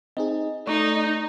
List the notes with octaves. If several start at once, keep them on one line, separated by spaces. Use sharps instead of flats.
C4 D#4 G#4 D#5
A3 D#4 D5 C#6